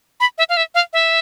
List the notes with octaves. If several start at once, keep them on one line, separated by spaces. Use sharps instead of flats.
B5
E5
F5
E5
F5
E5